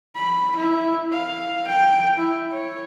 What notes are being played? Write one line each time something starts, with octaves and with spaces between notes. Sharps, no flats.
B5
E4
F5
G5
E4
C#5